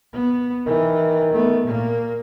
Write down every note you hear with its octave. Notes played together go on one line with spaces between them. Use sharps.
B3
D#3 E3
A3 B3
A#2 A#3